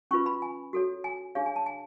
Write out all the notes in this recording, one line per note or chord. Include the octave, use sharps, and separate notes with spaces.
C#4 F4 B4 C#6
B5
G#5
F#4 A4 C#5
G#5
D4 G#4 C#5 F5
G#5
A5
G#5